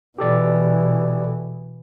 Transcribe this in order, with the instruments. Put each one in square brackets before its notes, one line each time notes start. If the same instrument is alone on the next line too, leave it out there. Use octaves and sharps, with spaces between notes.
[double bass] B2 E3 [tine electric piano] G4 A4 D5